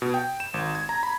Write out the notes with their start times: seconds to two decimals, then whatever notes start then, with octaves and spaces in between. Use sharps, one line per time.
0.02 B2
0.14 G5
0.40 E7
0.54 G#1
0.75 G#6
0.89 A#5
1.03 B5